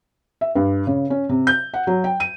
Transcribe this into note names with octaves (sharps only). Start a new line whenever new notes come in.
E5
G2
C#3
C#4
C3
G6
F#5
F#3
G5
D#7